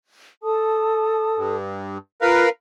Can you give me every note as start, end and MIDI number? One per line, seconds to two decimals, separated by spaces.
0.43 1.55 69
0.43 1.55 81
0.43 1.55 87
1.37 1.98 43
2.21 2.45 65
2.21 2.49 70
2.21 2.49 71
2.21 2.49 77